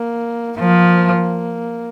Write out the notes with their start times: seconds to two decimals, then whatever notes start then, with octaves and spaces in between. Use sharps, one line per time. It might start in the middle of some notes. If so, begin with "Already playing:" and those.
Already playing: A#3
0.59 F3 A#3